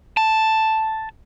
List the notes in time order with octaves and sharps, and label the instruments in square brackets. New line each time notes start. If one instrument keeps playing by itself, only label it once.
[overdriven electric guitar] A5